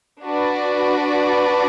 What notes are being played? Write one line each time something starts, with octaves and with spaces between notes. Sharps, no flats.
D4 F#4 B4 D5